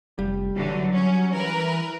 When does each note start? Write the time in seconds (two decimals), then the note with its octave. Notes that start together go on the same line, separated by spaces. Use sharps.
0.19 F1 G3
0.56 D3 E3 F#3 A3
0.92 C#4
1.33 E3 A#4 B4